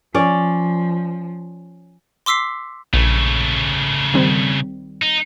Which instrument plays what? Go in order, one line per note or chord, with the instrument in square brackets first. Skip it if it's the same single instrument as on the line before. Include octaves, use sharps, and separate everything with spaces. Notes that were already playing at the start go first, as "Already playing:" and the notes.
[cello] F3 [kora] C#4 D5
[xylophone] C6 D6 E6 B6 C7
[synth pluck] A#1 [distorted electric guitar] C#3 A3
[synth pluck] D#3 G3 C4
[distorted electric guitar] D#4